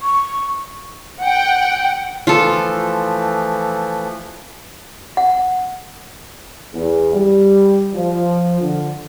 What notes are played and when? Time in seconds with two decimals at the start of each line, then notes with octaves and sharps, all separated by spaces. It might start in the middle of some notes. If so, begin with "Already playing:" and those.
0.01 C#6
1.21 F#5 G5
2.27 E3 F3 A3 F4 A4
5.17 F#5
6.74 E2
7.14 G3
7.94 F3
8.61 D3